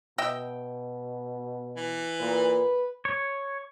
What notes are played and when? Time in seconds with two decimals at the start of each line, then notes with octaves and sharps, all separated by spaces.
0.18 B2 D#5 E5 G5
1.76 E3
2.20 A#2 B4
3.05 C#5